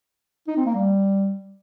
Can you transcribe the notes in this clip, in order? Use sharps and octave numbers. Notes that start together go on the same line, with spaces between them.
D#4
C4
A#3
G3